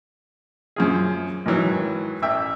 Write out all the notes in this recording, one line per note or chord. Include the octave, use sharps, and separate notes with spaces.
F#2 F3 G#4
G#2 D#3 E3 F#3
A1 E5 G5